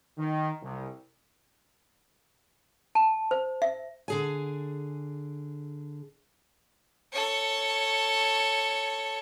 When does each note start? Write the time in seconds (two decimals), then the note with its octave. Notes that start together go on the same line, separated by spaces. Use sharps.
0.18 D#3
0.62 C2
2.95 A5
3.31 C5
3.62 E5
4.08 D3 G#4 G#5
7.12 A4 C#5